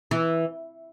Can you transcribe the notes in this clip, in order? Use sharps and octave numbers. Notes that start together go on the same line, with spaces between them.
E3